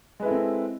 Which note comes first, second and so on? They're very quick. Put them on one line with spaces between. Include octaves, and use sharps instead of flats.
G#3 B4 E4 A4 C4